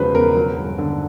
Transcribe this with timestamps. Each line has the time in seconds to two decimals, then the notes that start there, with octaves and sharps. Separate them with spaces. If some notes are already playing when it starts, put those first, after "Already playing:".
Already playing: E1 C#3 F3 B4 C5
0.14 E2 A#4
0.36 F#3
0.57 G1
0.78 D3